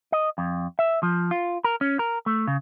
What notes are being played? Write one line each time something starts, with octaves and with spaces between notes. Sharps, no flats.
D#5
F2
E5
F3
F4
A#4
C#4
A#4
A3
C#3